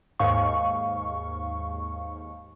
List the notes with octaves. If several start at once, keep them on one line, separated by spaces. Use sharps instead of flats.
D#2 G#2 F5 C#6